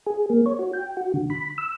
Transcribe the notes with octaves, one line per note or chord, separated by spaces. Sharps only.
G#4
A#3
C#5
F#4
G5
F#4
D3
B5
E6